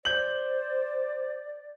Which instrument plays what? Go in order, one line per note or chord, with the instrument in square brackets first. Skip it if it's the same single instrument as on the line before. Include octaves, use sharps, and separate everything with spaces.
[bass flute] C5 [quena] D5 [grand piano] G6 F#7